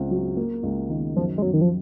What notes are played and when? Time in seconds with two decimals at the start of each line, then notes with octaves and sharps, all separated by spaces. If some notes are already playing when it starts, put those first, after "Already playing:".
Already playing: C#2 C4
0.11 F#3
0.37 A#3
0.63 C#2
0.90 D#3
1.16 F#2 F3
1.38 G#3
1.42 F#2 F#3
1.53 D#3
1.61 F3